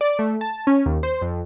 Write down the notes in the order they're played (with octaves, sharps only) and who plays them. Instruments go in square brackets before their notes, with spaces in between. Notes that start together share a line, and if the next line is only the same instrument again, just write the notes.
[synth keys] D5
A3
A5
C#4
D#2
C5
F2